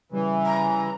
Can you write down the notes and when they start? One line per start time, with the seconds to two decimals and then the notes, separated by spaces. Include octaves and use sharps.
0.12 C#3 E3 G3
0.46 A#5